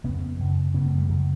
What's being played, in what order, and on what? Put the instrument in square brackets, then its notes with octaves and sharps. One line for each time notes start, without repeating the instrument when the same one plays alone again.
[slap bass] F2 C#3 B3 C#4
F#2 C#3
C#3 B3 C#4
F#2
A3 B3
G3 A3
F#2 C#3 F#3 G#3